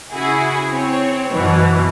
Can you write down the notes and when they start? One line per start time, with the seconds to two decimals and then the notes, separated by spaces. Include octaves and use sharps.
0.11 C#3 E4 F#4 G#4
0.69 C4 C#5
1.30 F#2 B2 E3